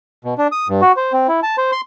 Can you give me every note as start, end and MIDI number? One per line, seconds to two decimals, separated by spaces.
0.25 0.34 47
0.38 0.47 62
0.52 0.68 87
0.69 0.81 43
0.82 0.92 66
0.97 1.13 72
1.13 1.27 60
1.28 1.40 64
1.43 1.56 81
1.58 1.71 72
1.72 1.81 84